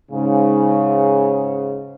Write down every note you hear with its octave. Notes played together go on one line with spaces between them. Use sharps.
G#2 C#3